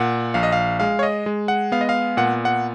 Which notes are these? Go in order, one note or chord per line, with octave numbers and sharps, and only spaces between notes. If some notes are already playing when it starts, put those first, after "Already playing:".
Already playing: A#2 F#5
A#1 F5
D#5
F5
G#3 F5
C#5
D#5
G#3
F#5
B3 F5
D#5
F5
A#2 F#5
F#5